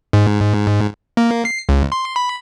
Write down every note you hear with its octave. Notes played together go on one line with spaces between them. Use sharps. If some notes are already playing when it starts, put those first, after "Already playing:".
G#2
A#3
C7
C#2
C6
B5